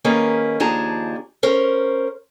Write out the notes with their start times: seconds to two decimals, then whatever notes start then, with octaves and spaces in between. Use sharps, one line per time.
0.04 D#3 A#3 C#4 G#4 A#4 B4
0.60 D#2 F3 D4 G#4 A5 A#5
1.43 C#4 A#4 C5